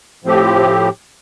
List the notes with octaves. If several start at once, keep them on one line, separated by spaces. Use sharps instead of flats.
A2 F3 C4 G4